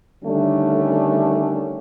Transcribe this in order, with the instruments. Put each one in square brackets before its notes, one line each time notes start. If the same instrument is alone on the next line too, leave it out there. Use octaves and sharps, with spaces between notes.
[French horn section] D3 D#3 G3 A3 C#4 D4